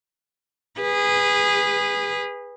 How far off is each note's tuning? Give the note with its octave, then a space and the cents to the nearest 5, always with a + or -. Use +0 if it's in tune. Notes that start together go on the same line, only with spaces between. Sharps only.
G#4 -25 B4 +0